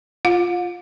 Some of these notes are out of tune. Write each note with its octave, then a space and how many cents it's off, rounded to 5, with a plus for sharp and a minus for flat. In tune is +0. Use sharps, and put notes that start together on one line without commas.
F4 +0 F5 +45